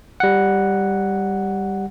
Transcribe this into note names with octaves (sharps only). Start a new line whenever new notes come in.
G3 F#5